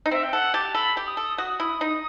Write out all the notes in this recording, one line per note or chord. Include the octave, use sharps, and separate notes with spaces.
D#4
C4 E5
G5
A4 F#5
G4 A5
A4 B5
G4
D#6
A4
D#6
F#4 D#6
E4
D#4